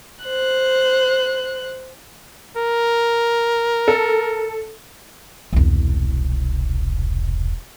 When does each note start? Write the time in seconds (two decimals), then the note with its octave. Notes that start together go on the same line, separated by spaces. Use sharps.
0.24 C5 F#6
2.57 A#4
3.88 A4
5.53 E1 C2